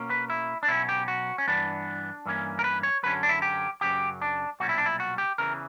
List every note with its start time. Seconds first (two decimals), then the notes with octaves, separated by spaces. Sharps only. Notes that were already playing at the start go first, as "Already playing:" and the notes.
Already playing: B2 A#3 C#4
0.10 B4
0.30 E4
0.63 D4
0.68 B1 B2 F#3 C#4 E4
0.89 G4
1.08 F#4
1.38 C#4
1.47 G2 E3 B3 D4
2.26 G2 E3 A#3 C#4
2.59 A#4
2.64 B4
2.83 C#5
3.03 F#2 D3 F#3 C#4 B4
3.23 D4
3.29 E4
3.42 G4
3.81 F#2 C#3 F#3 G4
4.22 D4
4.60 B1 A#2 G3 C#4 F#4
4.69 E4
4.78 D4
4.86 E4
5.00 F#4
5.18 G4
5.38 E2 C#3 E3 A#4